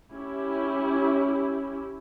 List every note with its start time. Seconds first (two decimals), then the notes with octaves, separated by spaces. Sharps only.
0.12 C#4 E4 G4